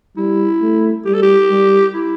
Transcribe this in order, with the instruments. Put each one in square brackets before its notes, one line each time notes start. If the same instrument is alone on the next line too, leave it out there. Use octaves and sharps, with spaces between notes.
[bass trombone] G3 [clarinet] E4
[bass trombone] A3
[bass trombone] G3 [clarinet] G4
[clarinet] A4
G4
[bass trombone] G3
[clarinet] E4